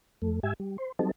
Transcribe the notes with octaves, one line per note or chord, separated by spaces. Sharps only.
F2 A3
G#2 G4 E5 G#5
G3
C5
F#3 G3 C4 D#4 A4